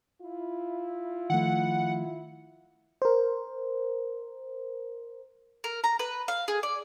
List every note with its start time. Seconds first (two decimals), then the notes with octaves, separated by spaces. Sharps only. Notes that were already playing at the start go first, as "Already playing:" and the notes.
0.22 E4 F4
1.30 D#3 F3 A3 F#5
3.02 A#4 C5
5.64 A#4
5.84 A#5
5.99 B4
6.28 F5
6.48 G#4
6.63 D5